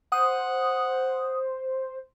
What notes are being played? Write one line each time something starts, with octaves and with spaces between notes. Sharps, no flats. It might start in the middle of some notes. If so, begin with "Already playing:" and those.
C5 F#5 D#6